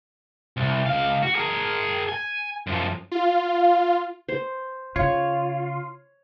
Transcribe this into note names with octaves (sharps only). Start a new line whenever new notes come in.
C2
C#2 F5
F#4
G#4 A#4
G#5
F#2 F3
F4
C5
C#3 F4 C#5